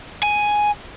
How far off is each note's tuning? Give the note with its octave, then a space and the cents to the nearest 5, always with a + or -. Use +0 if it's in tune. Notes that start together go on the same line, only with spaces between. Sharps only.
G#5 +5